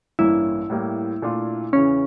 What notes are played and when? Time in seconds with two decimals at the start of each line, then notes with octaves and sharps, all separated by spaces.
0.19 A1 G2 E3 A#3 C#4 E4
0.70 A2 G3 A#3
1.22 A#2 A3 D4 F4
1.73 E2 C#3 E3 C#4